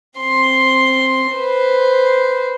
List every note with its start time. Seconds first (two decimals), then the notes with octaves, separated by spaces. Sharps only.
0.20 C4 C6
1.33 B4 C5